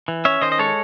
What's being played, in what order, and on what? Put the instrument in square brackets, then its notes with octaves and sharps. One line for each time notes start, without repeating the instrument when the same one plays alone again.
[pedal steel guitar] E3
C#4 C#5 E5
D#3 C5 D#5
D#5
G#3 A4 C#5